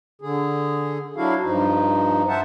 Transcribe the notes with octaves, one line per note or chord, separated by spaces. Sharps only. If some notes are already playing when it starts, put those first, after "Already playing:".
D3 G#4
F#3 D4 E4 F#4 F5
G2 F3 D#4
C5 E5 F#5 A5